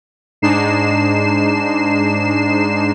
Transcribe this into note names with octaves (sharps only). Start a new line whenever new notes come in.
G#2 G#3 D4 D#4 C7 E7